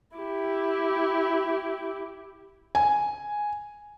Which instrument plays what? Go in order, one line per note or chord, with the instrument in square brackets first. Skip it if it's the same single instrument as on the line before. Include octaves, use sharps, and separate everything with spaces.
[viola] E4 G4
[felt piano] G#5